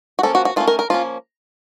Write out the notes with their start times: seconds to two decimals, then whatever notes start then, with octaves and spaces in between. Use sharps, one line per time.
0.19 F#4
0.23 F3 A#3 C#4 A4
0.35 F#4
0.45 F#4
0.56 D#3 A3 C#4 F4
0.67 A#4
0.79 A#4
0.90 F3 A#3 C#4 F4